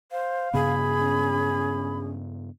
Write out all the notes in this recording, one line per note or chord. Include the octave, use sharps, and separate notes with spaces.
C5 F5
G2 C#3 B3 G#4 B5
C#4